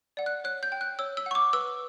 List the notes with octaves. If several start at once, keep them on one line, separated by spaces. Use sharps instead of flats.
D5 F#5
F#6
C#5 F#6
G6
G5
F#6
C#5 E6
E6
F#5 C#6
D6
B4 E6